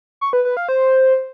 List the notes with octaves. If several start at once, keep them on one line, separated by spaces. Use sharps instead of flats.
C#6
B4
B4
F5
C5